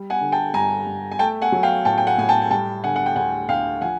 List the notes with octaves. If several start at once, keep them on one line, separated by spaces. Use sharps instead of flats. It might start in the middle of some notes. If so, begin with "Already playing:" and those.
Already playing: G3
F#5 G#5
D3
G5 A5
G2 G#5 A#5
G2
G#5
A3 G5 A5
F#5 G#5
F#3
F5 G5
A2 G5 A5
G5
F#5 G#5
A2 G#5
G5 A5
G#5
G3 G5 A5
D3 F#5 G#5
F#5
G5
D2 F#5 G#5
D2 F5 G5
F3 F#5 G#5